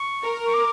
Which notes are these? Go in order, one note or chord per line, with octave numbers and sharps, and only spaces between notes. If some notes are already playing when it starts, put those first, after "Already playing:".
Already playing: C#6
A#4
C#6
D6